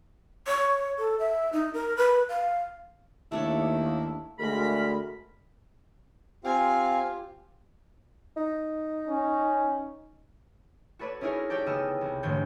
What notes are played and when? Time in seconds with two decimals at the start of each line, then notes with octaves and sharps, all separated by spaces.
0.47 C#5
0.98 A4
1.19 E5
1.53 D#4
1.74 A#4
1.97 B4
2.29 F5
3.32 D#2 A3 D4 E4 C#5
4.39 D2 G#3 A#4 B5
6.44 C4 F4 G4 F5 G#5
8.37 D#4
9.08 C#4
10.99 F#4 A4 B4 C#5 D5
11.21 C#4 D#4 E4 G#4 A#4 C#5
11.50 G4 C#5 D5 G5 A5
11.66 C#3 B3 D#5 E6 F6
12.01 C2
12.23 E1 A1 G#2 D3 C#5 G6